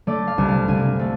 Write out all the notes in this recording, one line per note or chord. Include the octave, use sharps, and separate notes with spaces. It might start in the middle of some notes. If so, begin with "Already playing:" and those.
A3 D5
F5
C2
F5
C2 G#5
A3